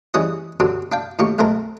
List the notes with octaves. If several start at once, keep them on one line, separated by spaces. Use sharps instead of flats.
E3 G3 C#4 G#4 D#5
D3 F#3 C4 G4
D4 F5 G5
A2 D#3 A#3 G4 C#6
B1 G#3 A3 C4 A#4